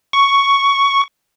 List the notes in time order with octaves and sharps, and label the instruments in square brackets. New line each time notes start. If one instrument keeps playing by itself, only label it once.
[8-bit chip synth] C#6